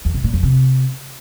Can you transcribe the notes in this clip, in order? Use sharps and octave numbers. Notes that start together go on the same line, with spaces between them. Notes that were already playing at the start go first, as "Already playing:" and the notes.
E2
B2
A#2
F2
C3